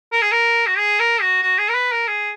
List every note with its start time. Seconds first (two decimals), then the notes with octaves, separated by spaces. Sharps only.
0.12 A#4
0.22 G#4
0.32 A#4
0.67 F#4
0.78 G#4
1.00 A#4
1.21 F#4
1.43 F#4
1.58 G#4
1.69 A#4
1.74 B4
1.92 A#4
2.08 G#4